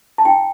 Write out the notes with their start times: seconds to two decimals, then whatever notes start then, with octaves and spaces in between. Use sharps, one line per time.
0.18 A5
0.25 E4 G5